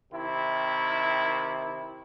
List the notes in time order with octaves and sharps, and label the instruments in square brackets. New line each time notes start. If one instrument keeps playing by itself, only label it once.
[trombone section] C3 D#3 E4